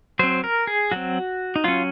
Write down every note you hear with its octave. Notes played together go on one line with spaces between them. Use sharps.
F#3 C4 C5
A#4
G#4
F#3 C4 F#4
D#4
F#3 C#4 F4